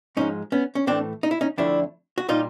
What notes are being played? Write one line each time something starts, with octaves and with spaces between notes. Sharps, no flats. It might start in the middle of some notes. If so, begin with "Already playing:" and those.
G#2 F3 G#3 C#4 D#4
B3 C#4
C#4
A2 E3 A3 C4 D4
D#4
E4
C#4 D#4
F2 D3 F3 A3 D4 E4
F#4
A#2 G3 D#4 F4